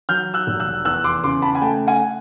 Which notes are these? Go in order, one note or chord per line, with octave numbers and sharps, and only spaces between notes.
F#3 F6 G6
E6 F#6
F1
E6 F#6
E2 E6 F#6
C6 D6
C#3 C6 D6
A5 B5
G#5
A3 G5 A5
F#5 G#5